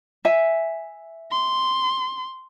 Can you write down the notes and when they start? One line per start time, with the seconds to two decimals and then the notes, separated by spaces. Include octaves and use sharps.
0.25 E5 G#5
1.31 C6